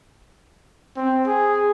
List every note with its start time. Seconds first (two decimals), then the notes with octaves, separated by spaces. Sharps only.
0.96 C4
1.27 G#4